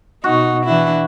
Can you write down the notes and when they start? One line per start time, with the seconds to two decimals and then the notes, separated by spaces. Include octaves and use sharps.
0.24 B2 D#4 F#4
0.65 E3 D4 E4